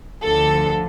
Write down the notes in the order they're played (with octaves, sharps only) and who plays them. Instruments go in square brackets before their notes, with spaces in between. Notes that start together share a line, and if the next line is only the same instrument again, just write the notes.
[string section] D2 D3 F3 A4